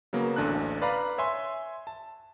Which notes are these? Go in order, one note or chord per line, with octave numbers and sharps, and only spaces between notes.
C#3 F#3 A#3 B3
A1 D2 D4 A4 F#6
B4 D5 F5 A#5 B5
C#5 E5 G#5 C6
A5